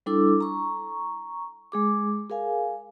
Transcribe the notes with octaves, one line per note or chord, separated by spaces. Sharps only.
G3 D4 E4 A4 D6 E6
A#5 C#6
G#3 G#4 D6
G#4 A#4 F5 G#5